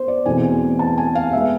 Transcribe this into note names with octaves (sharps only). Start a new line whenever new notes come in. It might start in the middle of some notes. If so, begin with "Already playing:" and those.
Already playing: B3 C5
D5
E2 B2 A3 C4 G#5
A5
G#5
F5
G#3 B3 E5